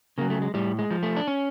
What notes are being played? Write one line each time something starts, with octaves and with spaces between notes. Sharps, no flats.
C#3 F#3 A#3
A3
G#3
A2 G3
G#3
F3
A3
D4
C#4